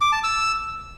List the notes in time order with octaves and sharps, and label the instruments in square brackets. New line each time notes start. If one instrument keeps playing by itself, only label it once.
[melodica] D6
A5
E6